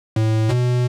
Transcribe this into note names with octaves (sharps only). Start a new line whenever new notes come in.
A2
B2